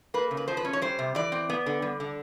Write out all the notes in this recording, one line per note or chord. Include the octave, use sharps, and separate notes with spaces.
A#3 B4
C#3
B4
F3 C5
B4
C#4
C#5
G3 C5
C3
E3 D5
C4
B3
D3
G3
D3